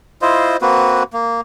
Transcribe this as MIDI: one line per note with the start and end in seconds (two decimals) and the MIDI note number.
0.22 0.57 64
0.22 0.57 65
0.22 0.57 72
0.22 0.57 75
0.61 1.03 58
0.61 1.03 60
0.61 1.03 66
0.61 1.03 71
1.13 1.41 58